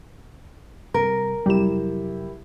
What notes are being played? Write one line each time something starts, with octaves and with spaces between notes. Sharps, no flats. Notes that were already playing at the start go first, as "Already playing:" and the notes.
C3 G3 A#4
F2 C3 F#3 G3 E4 G4 E7